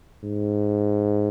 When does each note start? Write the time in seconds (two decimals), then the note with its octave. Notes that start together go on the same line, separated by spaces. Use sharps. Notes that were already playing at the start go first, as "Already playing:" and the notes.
0.24 G#2